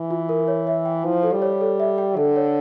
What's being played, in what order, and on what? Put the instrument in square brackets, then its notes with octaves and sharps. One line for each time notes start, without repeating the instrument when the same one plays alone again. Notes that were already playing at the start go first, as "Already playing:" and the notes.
Already playing: [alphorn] E3
[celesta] F4
A#4
C#5
E5
G5
[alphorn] F3 [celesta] E4
[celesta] A4
[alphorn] G3
[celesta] C#5
A4
E5
G5
[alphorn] D3 [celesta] A4
[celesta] C#5